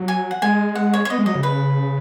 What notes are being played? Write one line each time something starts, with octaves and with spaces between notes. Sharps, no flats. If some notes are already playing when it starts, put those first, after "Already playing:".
Already playing: F#3
G#5
F#5
G#3 G#5
F#5
C#5
C#5
B3 D#5
G#3
F#3 D#5
C#3
B4